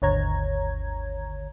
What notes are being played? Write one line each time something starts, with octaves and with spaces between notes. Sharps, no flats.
G#1 D#2 D3 C#5 A#5 G#6